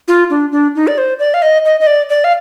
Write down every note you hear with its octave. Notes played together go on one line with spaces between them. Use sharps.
F4
D4
D4
D#4
D5
C5
D5
F5
D#5
D#5
D#5
D5
D5
F5